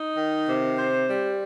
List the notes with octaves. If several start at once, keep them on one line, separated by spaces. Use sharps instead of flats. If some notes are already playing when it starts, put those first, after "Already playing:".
Already playing: D#4
D#3
C3
C5
G3